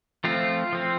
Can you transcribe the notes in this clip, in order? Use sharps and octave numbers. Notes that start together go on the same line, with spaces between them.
F3 A3 C4 F4
F3 C4